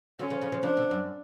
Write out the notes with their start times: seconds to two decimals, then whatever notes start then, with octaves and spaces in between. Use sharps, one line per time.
0.19 D3 F#3 C#4
0.30 C#3 F3
0.41 C#3 F3
0.52 C#3 F3
0.63 C#3 F3 D4
0.77 B2 D3
0.91 F#2